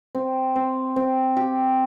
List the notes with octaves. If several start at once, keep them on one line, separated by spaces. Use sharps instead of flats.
C4
C4
C4
G4